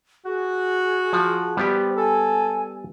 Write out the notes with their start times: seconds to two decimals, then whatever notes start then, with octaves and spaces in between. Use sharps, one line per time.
0.25 F#4 G#4
1.13 F3
1.57 G3 B3 G4 C5
1.97 A4 G#5